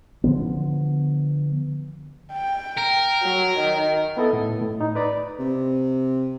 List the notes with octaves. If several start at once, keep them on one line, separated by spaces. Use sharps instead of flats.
D3 F3 B3
G5
A#4
F#3
D#3
B3 E4 A4 D#5
A2
A2
D#4
B4 D5 A#5 B5
C3